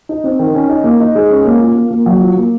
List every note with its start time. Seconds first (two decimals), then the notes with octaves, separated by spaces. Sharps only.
0.09 D#4
0.24 C4
0.39 D#3
0.54 C#4
0.69 D#4
0.84 A#3
1.00 D#4
1.15 G#3
1.31 C#4
1.45 A#3
1.61 F4
1.75 A#3
1.91 A#3
2.06 F#3
2.21 F4
2.37 A#3